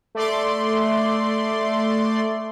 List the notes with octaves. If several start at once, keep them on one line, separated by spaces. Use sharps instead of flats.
A3 D5 C6